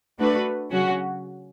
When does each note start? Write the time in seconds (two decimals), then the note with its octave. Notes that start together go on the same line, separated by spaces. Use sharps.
0.19 A3 D4 F#4 B4
0.71 C#3 F#3 C#4 F#4